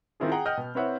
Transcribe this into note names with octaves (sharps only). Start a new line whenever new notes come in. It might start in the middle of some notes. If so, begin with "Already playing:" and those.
D#3 C4 E4 F4 G#4
G#4 F#5 G5 A#5
D#5 F#5 G5 F6 G6
B2
C4 E4 B4 C#5 E5 F#5